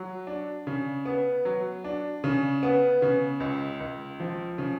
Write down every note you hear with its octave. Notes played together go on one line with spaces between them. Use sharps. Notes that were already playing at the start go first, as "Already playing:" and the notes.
Already playing: F#3
D4
C#3
B3
F#3
D4
C#3
B3
C#3
C#2
C#2
F3
C#3